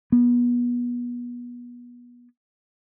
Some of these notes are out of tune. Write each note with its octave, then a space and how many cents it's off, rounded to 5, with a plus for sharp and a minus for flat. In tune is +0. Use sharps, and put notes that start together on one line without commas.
B3 -25